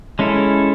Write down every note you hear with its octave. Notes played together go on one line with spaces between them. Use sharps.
G#3 C#4 E4 A4